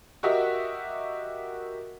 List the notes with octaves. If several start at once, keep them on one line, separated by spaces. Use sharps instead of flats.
F#4 G4 A#4 D#5 E5 F#5